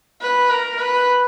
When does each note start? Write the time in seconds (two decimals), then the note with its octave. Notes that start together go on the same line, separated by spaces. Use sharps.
0.22 B4
0.50 A#4
0.80 B4